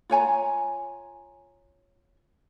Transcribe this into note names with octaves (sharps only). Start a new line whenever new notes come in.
F4 C#5 G#5 A#5